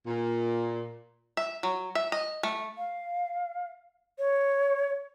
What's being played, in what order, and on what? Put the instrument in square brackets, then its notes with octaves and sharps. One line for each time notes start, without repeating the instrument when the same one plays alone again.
[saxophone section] A#2
[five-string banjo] E5
F#3
E5
D#5
A3
[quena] F5
C#5